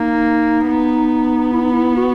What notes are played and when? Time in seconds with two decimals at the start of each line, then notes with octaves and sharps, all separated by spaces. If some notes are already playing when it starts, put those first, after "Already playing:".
Already playing: A#3 D#4
0.66 B3
1.52 E4
1.62 D#4
1.71 E4
1.97 F#4